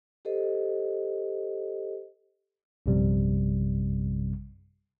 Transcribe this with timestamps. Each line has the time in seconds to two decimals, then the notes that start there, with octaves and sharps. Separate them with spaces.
0.25 G4 A4 C5 D#5
2.86 A#1 F#2 C3 G3